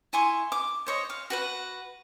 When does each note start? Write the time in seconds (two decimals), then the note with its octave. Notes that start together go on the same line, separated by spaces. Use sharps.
0.13 E4 G#5 C6 C#6
0.52 D6
0.86 C5 C#5 D#5
1.10 F5
1.30 F#4 B4 F#5